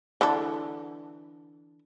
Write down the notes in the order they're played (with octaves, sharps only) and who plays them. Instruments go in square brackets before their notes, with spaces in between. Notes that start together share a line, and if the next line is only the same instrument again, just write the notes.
[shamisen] D3 E3 A4